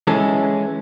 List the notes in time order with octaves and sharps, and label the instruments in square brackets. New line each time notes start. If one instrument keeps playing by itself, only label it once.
[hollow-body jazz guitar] E3 G#3 C#4 A4